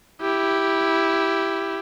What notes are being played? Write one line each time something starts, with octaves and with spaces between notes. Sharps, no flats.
E4 G4